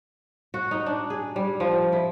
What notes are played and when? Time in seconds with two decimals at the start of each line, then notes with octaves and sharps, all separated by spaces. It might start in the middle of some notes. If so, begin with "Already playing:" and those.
0.54 F#4
0.71 D#4
0.86 D4
1.10 G#4
1.36 G3
1.60 F3
1.92 E4